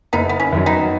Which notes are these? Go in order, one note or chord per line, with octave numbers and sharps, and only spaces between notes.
F#1 B3 D#4
B3
C#4
F#2 D#3 F#3
B3 D#4